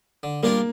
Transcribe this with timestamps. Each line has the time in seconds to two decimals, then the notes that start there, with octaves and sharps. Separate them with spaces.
0.23 D3
0.43 G3 A#3 D4 F4 A#4